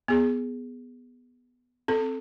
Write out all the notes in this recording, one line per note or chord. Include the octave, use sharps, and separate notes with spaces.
B3 G#4
C4 A4